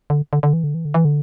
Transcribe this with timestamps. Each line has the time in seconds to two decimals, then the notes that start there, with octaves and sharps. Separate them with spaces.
0.10 D3
0.33 D3
0.43 D3
0.53 E3
0.64 D3
0.74 E3
0.85 D3
0.94 E3
1.05 D3